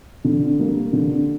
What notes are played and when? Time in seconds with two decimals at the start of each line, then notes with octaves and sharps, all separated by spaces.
0.24 D3
0.59 G3 A#3
0.93 D3